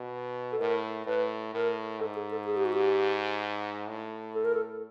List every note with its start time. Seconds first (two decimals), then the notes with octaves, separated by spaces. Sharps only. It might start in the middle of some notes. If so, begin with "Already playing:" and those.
Already playing: B2
0.52 A4
0.60 A2 A#4
1.06 A2 B4
1.54 A2 A#4
2.00 G#2 A4
2.16 G#4
2.32 A4
2.47 G#4
2.56 G4
2.65 F#4
2.74 G4
3.88 A2
4.35 A4
4.44 A#4
4.54 A4